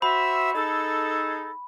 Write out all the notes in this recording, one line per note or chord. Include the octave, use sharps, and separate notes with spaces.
F#4 C5 E5 B5
D#4 G#4 A4